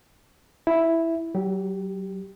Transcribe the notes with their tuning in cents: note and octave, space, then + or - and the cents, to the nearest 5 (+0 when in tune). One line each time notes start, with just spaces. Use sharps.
E4 +0 E5 +0
F#3 +30 G4 +0